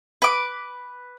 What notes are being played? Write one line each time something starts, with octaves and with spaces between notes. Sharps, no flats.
B4 D6